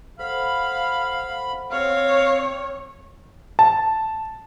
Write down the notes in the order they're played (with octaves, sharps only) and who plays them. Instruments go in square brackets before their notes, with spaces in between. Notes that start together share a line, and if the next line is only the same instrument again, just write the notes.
[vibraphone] A4 C5 F#5 [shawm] F5 [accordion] B5
[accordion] C4 [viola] C#5 [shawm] F5
[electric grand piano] A5